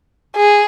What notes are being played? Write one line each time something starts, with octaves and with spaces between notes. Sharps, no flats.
G#4